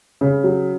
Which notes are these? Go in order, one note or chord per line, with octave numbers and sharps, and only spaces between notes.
C#3
F#3